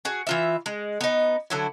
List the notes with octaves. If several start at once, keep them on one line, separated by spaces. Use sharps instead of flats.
F#4 G#4
E3 F4 E5
G#3
B3 D#4
D3 F#3 E4